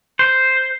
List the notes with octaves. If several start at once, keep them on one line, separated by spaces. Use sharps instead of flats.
C5